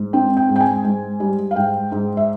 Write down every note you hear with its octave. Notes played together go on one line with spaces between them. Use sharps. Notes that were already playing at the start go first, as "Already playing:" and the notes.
Already playing: G#2
C4 G5
G5
G#2
G5
G#5
G#2
G3
F5
G#2 G5
G#2
E5